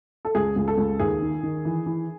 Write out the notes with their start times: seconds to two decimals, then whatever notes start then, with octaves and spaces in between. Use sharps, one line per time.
0.25 A4
0.35 C#2 G#4
0.56 C#2 G#4
0.68 A4
0.78 C#2
0.99 D#2 G#4
1.22 D#3
1.43 D#3
1.65 E3
1.86 E3